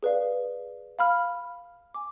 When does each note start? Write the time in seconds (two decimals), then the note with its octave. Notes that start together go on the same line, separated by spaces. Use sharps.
0.03 G#4 B4 D5 F5
0.99 F5 B5 F6
1.94 G#5 D6